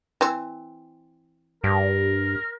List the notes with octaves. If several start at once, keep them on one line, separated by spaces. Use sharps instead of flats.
E3 C4
G2 A#4